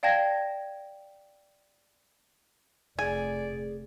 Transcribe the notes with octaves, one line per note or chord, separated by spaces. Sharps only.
D5 F5 G5 A5 G#6 A#6
F1 G#4 D5 G#5